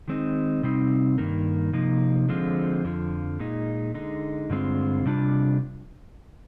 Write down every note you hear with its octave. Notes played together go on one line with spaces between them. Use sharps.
D#3 G#3 C4 D#4
C3 G3 C4 D#4
G2 D#3 A#3
C3 F3 A#3 D#4
D3 F3 G#3 C4 F4
F2 D3 F3
A#2 G#3 D#4
D3 G#3 D#4
G2 D3 G#3 C4 F4
C3 G3 D4 F4